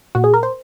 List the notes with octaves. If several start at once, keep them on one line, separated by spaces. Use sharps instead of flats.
A#2 F#4
G#4
A#4
C5